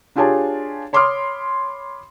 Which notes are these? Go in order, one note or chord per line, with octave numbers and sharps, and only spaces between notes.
D4 F4 G4 G#4 C#5 A5
C#5 B5 C6 D6 D#6 F6